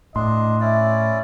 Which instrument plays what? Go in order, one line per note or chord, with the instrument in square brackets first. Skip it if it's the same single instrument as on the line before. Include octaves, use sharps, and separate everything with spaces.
[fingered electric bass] A2 [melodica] D4 [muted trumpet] D#5 [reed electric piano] C6
[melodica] C#4 E4 D5 [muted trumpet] E5